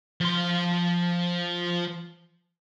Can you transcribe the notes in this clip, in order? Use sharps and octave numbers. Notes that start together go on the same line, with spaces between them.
F3 C6